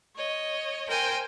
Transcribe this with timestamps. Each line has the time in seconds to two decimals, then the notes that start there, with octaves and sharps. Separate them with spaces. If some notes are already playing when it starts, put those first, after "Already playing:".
0.15 C#5 D#5
0.87 A#4 C5 G5 G#5